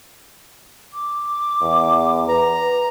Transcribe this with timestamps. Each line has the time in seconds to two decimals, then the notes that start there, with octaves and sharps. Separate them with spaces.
0.94 D6
1.61 E2
2.28 B4 A#5